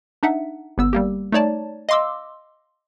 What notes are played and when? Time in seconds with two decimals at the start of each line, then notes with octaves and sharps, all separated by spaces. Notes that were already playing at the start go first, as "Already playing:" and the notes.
0.23 D4 D#4 E5 F#5
0.78 G1 B3 E6
0.93 G3 A#3 G4
1.32 A3 D#4 C#5 D5 A5
1.89 D#5 F5 C6 D6 E6